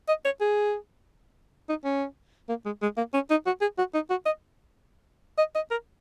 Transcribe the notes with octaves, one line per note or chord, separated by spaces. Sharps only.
D#5
C#5
G#4
D#4
C#4
A#3
G#3
G#3
A#3
C#4
D#4
F#4
G#4
F#4
D#4
F#4
D#5
D#5
D#5
A#4